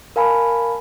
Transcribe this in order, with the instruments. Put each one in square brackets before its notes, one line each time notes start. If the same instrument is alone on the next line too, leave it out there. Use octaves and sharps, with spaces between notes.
[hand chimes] A#4 F5 G#5 A5 B5